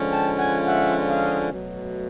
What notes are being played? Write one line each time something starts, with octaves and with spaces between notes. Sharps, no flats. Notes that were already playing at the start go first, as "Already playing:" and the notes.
Already playing: D3 F3 G#3 C#4 F4
G5 A5
F#5 G#5
E5 F#5
D#5 F5
B2 F#3 A3